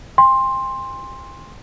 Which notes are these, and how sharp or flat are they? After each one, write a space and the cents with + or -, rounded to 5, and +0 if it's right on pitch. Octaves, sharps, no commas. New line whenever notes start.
G5 +45 C6 +10